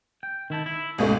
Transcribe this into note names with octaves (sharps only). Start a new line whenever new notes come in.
G5
D#3 E4 A5
E4
C#2 G#2 B2 A3 G#4